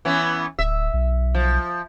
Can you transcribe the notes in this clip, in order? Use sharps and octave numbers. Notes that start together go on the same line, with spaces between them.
E3 B3 C#4
D1 E5
B1
F3